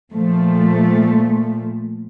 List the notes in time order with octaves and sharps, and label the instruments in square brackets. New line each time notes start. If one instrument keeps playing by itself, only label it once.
[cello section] A#2 F3 A3